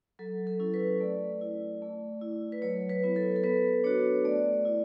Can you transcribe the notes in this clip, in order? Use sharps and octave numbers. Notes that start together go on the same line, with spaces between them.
F#3 A4
A4
C#4 E4
B4
A3 D5
E4
A3
E4
B4
F#3 C#5
B4
B3 E4
A4
A4
B3 B4
D4 F#4 C#5
A3 D5
E4